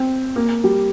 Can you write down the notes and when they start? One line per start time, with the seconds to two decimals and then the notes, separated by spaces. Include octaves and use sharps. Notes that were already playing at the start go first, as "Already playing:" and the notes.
Already playing: C4
0.36 A#3
0.64 G3